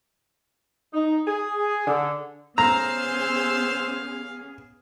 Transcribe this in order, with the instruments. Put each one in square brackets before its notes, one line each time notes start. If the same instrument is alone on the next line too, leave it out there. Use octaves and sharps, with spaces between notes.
[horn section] D#4
G#4
D3
[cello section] B3 C#4 G#4 [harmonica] C5 E6 [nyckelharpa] F5 [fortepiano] A#5